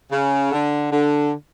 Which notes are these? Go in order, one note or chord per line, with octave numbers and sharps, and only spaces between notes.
C#3
D3
D3